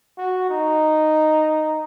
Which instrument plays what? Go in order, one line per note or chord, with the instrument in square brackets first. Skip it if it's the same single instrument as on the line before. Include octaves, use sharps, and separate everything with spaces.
[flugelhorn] F#4
D#4